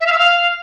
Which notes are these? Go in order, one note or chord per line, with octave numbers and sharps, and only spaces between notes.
E5
F5
E6
F5